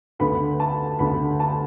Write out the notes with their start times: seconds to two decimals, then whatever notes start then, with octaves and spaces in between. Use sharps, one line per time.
0.19 D2 D3 B3 B5
0.60 A5
0.99 D2 D3 B3 B5
1.40 A5